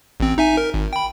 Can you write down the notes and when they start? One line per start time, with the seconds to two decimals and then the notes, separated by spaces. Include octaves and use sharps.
0.20 A1 C4
0.38 D#4 E5 G#5
0.57 A#4
0.74 G#1
0.93 G5 B5